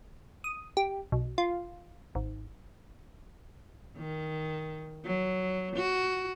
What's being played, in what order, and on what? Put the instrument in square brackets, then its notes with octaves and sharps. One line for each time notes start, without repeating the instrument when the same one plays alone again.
[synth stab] D#6
G4
B1
F4
G#1
[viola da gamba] D#3
F#3
F#4